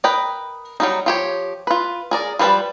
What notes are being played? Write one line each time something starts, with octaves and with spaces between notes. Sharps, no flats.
A#4 B4 D#5 G5
F#3 G3 A3 D#4
F3 G4 C#5
F4 B4
G#4 A#4 D5
F3 G3 B4 D5 A5